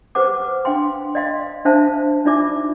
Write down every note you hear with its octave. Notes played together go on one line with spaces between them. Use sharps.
G4 B4 C5 F#5 D6
D4 F5 G5 C6
D5 D#5 F5 C6
D4 C5 E5 F5 A5
D4 D#4 F4 D5 E5 D6